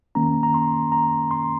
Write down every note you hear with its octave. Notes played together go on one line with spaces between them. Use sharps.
D#3 A#3 C#4 A#5
A#5
C6
A#5
C6